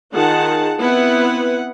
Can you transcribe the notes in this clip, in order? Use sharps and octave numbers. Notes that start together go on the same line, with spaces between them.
D#3 F4 G#4 F#5 A5
B3 C4 E4 B4 F#5